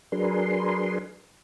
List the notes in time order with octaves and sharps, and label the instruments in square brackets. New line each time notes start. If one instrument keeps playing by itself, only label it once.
[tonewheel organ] F#3 D4 G#4 A#4 B4 C6